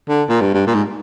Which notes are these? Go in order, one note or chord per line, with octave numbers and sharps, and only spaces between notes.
D3
A#2
G2
G2
A#2
G#2